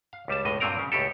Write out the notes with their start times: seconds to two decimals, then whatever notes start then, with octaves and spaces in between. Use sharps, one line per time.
0.13 F5
0.28 C#2 G3 A5
0.45 G1 C#2 A2 D#5
0.60 G2 A#2 F#3 C4 A#4 A#5
0.79 C#3
0.92 C#2 A2 G4 A4